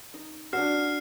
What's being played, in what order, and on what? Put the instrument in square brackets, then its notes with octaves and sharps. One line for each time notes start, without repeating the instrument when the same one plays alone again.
[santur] D#4
[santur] D4 E6 [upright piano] F#4 [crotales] F6 C7